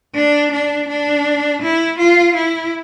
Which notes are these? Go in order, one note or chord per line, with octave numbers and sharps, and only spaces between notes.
D4
D4
D4
E4
F4
E4